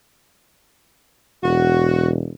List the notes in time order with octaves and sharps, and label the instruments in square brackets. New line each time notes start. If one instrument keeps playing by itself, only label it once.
[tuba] E1 [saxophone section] F#4